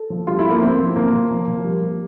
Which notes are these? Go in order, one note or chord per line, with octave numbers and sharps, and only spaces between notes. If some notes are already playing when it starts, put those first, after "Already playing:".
Already playing: A4
F3
G3 F4
E4
G3
A#3
F3 C4
F3
F3 A#3
F3
F3
F3
G3
G3